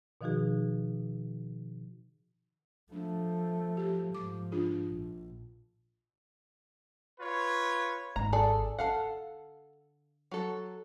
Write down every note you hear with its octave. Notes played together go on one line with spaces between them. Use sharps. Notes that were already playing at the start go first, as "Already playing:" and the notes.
B2 D#3 F3 D#4 F#4 G#4
F3 A3 D4
G4
G#2 F3 D6
D4 F4 G#4
A#1
F4 B4 C#5
G#1 A#5
G#4 A4 D5
D3 A4 F5 F#5
F#3 A4